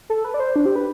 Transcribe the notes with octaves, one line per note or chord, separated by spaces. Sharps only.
A4
B4
D5
C5
D4
G4
B4